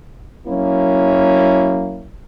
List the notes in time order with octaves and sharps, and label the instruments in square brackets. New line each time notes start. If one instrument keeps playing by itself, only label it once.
[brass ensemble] F#3 A#3 C#4 E4